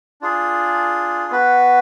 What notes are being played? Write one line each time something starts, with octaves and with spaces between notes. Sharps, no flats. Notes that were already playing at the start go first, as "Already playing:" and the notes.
D4 F4 G#4
B3 F#4 B4